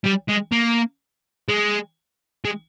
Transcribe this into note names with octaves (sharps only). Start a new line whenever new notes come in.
G3
G#3
A#3
G#3
G#3